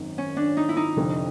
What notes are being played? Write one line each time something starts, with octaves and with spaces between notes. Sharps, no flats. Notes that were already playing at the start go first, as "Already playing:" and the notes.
Already playing: G#1 F#2 D#3
C#4
D4
D#4
E4
D#4
F1 F2 D3